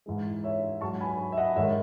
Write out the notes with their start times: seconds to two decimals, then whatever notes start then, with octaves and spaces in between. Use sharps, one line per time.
0.06 G#2 E3 G#3
0.44 C#5 E5
0.81 G#2 F#3 A5 C#6
1.01 G#5 B5
1.32 E5
1.37 D#5 F#5
1.56 G#2 D#3 G#3 C#5 E5